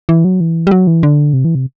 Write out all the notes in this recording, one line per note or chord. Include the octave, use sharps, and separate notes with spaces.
E3
F#3
E3
G3
F#3
E3
D3
C3
E3
C3